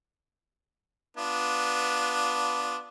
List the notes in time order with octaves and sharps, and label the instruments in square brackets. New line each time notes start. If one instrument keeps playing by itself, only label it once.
[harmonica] B3 D4 F4